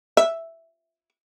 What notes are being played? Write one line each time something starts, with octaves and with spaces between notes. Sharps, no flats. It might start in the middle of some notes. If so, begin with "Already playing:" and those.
E5